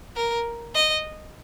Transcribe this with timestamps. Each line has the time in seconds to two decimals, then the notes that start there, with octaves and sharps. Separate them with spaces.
0.16 A#4
0.75 D#5